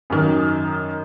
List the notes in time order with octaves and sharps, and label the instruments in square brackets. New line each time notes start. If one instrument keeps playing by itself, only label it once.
[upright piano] F#2 D#3